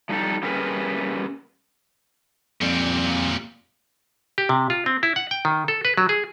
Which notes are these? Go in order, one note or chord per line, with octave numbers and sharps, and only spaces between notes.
F3 G3 D#4 G4 A4
G3 A#3 C#4 G#4 A#4 B4
F2 A#2 G3
G4
C3
F4
C4
E4
F#5
G5
D#3
A4
B4
F#3
G#4